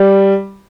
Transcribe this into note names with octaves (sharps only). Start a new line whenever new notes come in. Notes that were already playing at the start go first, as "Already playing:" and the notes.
Already playing: G3